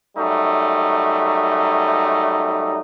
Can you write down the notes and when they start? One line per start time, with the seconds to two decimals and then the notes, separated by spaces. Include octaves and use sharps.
0.17 F#2 G3 A3 D#4